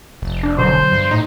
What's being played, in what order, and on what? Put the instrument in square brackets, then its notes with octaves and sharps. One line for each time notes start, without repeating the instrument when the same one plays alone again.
[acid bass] F1
[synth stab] D4
[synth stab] B2 D3 F#3 [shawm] C5
[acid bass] G2
[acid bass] A2 [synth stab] D#4